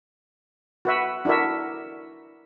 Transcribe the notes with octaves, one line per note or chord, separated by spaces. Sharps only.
F#4 B4 E5
D4 E4 F#4 A#4 E5